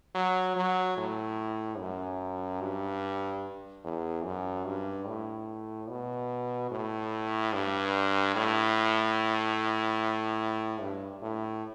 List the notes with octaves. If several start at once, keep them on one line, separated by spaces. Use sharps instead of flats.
F#3
F#3
A2
F#2
G2
E2
F#2
G2
A2
B2
A2
G2
A2
G2
A2